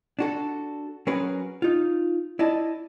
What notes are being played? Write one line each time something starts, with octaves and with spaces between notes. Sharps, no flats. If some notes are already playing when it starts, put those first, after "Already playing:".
D4 F#4 A4
F#3 C#4 F#4 G#4 A#4 B4
D#4 F4
E4 D5 D#5 A5